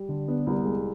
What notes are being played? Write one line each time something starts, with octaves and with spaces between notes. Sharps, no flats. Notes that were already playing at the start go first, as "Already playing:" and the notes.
Already playing: G3
D3
B3 D4
C2
G#3